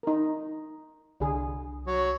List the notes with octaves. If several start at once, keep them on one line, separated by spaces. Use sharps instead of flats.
D#4 A#4
C2 D3 G#4
F#3